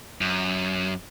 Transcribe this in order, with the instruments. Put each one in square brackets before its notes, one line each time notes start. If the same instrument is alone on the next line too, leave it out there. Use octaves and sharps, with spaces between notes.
[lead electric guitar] F#2